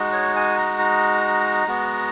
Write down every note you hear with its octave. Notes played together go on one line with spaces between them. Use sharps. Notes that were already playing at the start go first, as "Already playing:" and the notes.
Already playing: G#3 D#4 F#4
C#5
G#5
A#5
A#5
G#3 B3 F#4